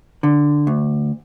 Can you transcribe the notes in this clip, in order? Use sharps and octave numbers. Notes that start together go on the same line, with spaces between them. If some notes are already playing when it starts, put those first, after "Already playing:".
D3
D2